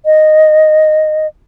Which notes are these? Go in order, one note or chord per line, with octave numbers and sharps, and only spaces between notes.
D#5